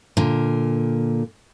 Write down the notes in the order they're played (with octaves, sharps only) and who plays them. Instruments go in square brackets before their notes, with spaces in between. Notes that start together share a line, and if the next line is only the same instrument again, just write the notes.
[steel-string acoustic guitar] A#2 D3